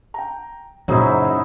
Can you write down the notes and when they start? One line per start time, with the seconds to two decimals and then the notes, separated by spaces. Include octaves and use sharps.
0.14 G5 A#5
0.88 F#2 A#2 C#3 F#3 G#3 D#4 E4 C5